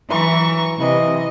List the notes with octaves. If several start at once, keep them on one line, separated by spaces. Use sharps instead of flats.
E3 F#3 A#5 C#6
C3 E3 D#5